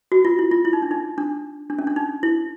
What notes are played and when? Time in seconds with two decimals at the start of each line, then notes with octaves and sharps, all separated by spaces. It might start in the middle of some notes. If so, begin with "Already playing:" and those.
0.12 F#4
0.25 F4
0.39 E4
0.51 F4
0.65 E4
0.73 D#4
0.82 D4
0.91 D#4
1.18 D4
1.70 D4
1.79 C#4
1.87 D4
1.96 D#4
2.23 E4